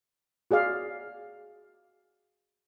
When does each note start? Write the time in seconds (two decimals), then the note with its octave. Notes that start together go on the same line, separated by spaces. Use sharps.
0.51 F#4 G#4 D5 F5